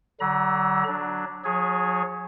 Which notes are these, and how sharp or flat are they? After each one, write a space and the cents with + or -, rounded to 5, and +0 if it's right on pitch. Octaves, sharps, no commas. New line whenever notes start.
D3 +0 F#3 +25 A#5 +40
F#3 +0 D4 +0
F#3 -45 G#4 +0 C#5 -5